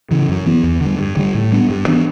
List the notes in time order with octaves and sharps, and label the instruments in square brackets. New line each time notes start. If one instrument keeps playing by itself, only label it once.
[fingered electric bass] C#3 E3
F#2
E3 B3
E2
D3 G3
G2
D3 G3
A2
G3 B3 D4
G2
E3 B3 D4